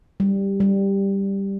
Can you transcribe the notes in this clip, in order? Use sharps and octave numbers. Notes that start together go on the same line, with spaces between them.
G3
G3